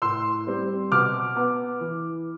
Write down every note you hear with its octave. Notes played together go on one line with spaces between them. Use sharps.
A2 C6 E6
G3 C4
B2 D6 F6
B3
E3